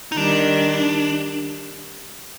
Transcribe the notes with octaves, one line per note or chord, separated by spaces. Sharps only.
D#4
D#3 G3 D4